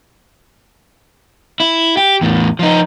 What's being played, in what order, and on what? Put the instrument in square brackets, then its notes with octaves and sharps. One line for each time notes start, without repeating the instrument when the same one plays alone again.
[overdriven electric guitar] E4
G4
E2 A2
F3 D#4